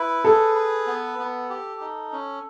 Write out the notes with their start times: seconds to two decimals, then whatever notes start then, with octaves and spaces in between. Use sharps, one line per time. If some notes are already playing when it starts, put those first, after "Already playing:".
Already playing: E4 B4
0.25 G#4 A4
0.55 B4
0.87 B3
1.19 B3
1.50 G4
1.81 D#4
2.12 C#4